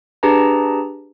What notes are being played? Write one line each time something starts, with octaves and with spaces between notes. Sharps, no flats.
D4 G4 G#4 B4 A5 A#5